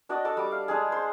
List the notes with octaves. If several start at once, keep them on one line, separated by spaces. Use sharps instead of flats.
D4 F#4 D5 D#5
A4 D5 A5
G3 D6
F5
G#3 D4 G#4
C5